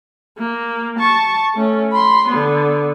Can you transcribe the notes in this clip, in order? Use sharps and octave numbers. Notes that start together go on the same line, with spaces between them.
A#3
A5 C#6
A3 C#4
B5 C6
D3 B3